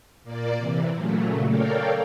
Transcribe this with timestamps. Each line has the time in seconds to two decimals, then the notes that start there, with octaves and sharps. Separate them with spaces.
0.24 A#2 A#3 D5
0.57 C3 E3
0.93 A#2 C#3 F#3 A3
1.48 A4 A#4 C#5 D5 F5 G5